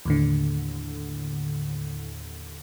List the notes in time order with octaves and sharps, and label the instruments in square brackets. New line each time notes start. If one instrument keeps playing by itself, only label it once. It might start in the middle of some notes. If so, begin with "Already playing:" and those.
[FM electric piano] D#2 A2 D3